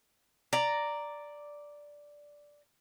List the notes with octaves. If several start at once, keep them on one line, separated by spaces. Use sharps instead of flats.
D5 A#5